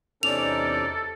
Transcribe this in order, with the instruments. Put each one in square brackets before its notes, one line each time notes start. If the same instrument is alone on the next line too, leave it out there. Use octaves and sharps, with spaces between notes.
[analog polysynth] E2 D5 [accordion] C3 C#4 D#4 [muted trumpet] A4 [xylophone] F7